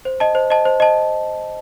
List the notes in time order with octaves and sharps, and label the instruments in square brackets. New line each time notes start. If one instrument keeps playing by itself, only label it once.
[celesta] C5
D#5 A5
C5
D#5 A5
C5
D#5 A5